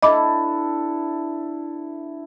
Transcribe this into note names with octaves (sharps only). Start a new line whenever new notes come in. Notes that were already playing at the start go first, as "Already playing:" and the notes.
D4 E4 A4 D#5 B5 D6